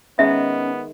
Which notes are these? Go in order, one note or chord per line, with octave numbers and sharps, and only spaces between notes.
D#3 G#3 B3 C#4 E5